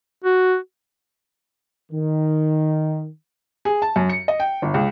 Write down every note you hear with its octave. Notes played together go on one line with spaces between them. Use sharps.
F#4
D#3
G#4
A5
F#2
C#7
D#5
G5
G1
C#2